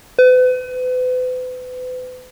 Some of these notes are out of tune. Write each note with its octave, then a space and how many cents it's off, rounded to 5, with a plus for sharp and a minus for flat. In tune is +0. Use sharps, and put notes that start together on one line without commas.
B4 +40